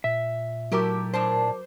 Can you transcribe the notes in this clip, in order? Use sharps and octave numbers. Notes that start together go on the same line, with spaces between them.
A#2 E5
F#3 A3 E4 G4 A#4 D6
A2 D4 C5 A5